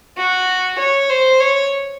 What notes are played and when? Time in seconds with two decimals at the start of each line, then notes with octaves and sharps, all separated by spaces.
0.18 F#4
0.79 C#5
1.10 C5
1.40 C#5